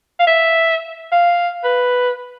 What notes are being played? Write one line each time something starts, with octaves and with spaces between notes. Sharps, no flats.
F5
E5
F5
B4